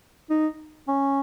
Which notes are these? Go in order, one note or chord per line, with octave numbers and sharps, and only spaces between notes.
D#4
C#4